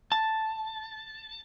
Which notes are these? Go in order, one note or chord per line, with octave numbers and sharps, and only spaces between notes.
A5